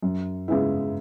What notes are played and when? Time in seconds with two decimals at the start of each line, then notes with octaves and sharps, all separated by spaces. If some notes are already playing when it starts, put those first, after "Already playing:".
0.02 F#2
0.48 C#3 G#3 B3 E4